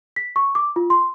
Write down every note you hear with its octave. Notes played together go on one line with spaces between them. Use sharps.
B6
C#6
D6
F4
C6